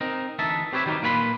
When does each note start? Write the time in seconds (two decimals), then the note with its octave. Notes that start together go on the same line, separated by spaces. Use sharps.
0.01 C4 D#4 A#4
0.39 D2 E3 D#4 E5 A5
0.72 C4 G4 B4 C#5 E5
0.86 D#3 F#3 G3 D#4
1.02 A#2 A#3 B4 C#5 B5 C6